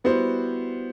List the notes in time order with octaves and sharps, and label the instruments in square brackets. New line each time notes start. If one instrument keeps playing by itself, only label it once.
[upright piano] G3 B3 E4 F#4 C5